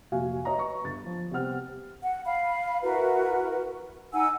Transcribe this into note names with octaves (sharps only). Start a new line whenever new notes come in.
F1 A#2 F#4 F5 G#5
C#5 D#5 A#5
B4 A#5 C#6
G1 A6
F3
C3 G3 B3 C4 F#5 F6
F#5
F5 B5
E4 F#4 A#4 B4
D#4 F#5 G#5 E6